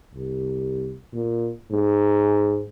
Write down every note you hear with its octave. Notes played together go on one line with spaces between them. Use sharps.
C2
A#2
G#2